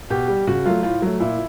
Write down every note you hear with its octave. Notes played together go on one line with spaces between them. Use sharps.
B2 G4
G3
C#3 F#4
F#3 A3 F4
A2 F4
F#3 A3
A#2 E4